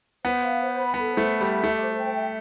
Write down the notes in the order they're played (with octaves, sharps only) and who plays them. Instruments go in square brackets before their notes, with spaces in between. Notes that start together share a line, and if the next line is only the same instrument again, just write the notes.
[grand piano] B3 [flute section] C5
[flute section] F5
C5
B5
[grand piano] B3 [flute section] A4
[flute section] C5
[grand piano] A3
[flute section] A4
[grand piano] G3
[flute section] E5
[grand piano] A3 [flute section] G4
[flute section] C5
G5
E5